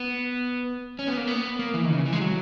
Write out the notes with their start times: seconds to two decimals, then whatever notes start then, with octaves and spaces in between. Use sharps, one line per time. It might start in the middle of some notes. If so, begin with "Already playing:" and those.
Already playing: B3
0.99 C#4
1.07 B3
1.17 A#3
1.27 B3
1.59 A#3
1.74 E3
1.85 D#3
1.90 C#3
2.05 E3
2.12 G#3
2.21 F#3